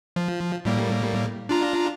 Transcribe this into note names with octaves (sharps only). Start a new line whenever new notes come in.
F3
A2 G3 A#3
D4 F4 A#5